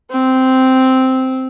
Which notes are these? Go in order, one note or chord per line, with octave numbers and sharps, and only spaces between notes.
C4